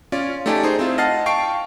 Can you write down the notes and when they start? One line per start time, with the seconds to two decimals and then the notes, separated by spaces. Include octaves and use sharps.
0.12 C#4 F4 D5
0.46 A3 D#4 G4 D5 G#5 A5
0.63 D#4 G#4 C5
0.79 C4 E4 F4
0.98 D#5 F#5 A5 F6 A6 C7
1.26 F5 G5 A5 C#6 C7 D7